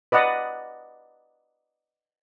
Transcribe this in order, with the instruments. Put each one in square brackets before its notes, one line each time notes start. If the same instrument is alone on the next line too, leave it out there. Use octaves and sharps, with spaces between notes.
[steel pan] B4 D5 D#5 F#5